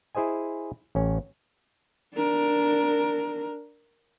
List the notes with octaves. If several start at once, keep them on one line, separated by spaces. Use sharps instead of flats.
E4 G#4 C5 D#5 G#5
A1 C#4
D4 A#4